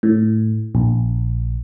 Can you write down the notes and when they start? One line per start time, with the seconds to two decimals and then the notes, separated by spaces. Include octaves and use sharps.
0.03 A2
0.75 A#1